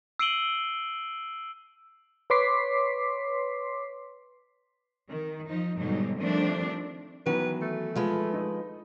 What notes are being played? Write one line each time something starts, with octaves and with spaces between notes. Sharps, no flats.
E6 C7 D7 D#7 F#7 G7
B4 C#5 C6 D6 B6 C7
D#3
F3 D#4
G#2 B2 D3 F#3 G3 D#4
D#3 F3 G3 A3 C4 D4
D#3 E3 F#3 B3 B4
A3
F3 G#3 B4
D#4 D#5